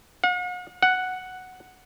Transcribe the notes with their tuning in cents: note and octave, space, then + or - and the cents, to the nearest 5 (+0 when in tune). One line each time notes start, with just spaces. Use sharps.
F#5 -45
F#5 +0